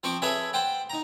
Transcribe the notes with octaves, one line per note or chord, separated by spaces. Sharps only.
F3 C4 C5 C#6 D6
G#4 A4 B4 C#5 E5 G#5
C5 F#5 G5 A5
D#4 A#5